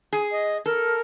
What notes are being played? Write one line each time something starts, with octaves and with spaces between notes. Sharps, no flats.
G#4
D#5
A4 A#4